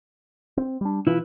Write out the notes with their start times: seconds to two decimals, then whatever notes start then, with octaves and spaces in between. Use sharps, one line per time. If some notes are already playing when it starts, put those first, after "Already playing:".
0.57 C4
0.81 G3 D4
1.07 B2 E3 E4 F4 B4